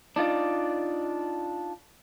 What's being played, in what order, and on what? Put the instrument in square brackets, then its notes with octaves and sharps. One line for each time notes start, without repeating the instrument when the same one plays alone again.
[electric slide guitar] D4 D#4 F4 D5